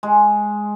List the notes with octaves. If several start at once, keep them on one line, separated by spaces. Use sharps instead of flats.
G#3